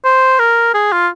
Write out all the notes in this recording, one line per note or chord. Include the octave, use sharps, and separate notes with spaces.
C5
A#4
G#4
F4